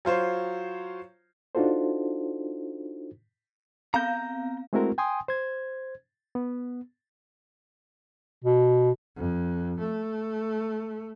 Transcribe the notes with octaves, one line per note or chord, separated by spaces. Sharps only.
F#3 F4 C5 C#5
D4 D#4 F4 F#4 A4 C5
B3 C4 F5 A#5 G6
G#3 A3 C4 E4 F#4 A#4
G5 G#5 C6 D#6
C5 G#6
B3
B2
F2
A3